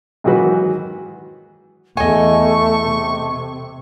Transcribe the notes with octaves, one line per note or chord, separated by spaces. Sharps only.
G#2 D#3 E3 F#3 F#4 B4
E2 A3 D#5 G#5 C#6
C3